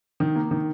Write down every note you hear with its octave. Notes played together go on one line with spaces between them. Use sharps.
D#3
A#3
D#3